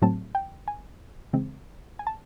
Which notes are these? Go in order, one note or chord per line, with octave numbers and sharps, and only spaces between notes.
A2 F#3 A3 C4 A5
G5
G#5
C#3 E3 G#3 C4
G#5
A5